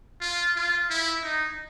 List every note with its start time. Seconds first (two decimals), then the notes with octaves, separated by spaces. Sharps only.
0.21 F4
0.56 F4
0.90 E4
1.23 D#4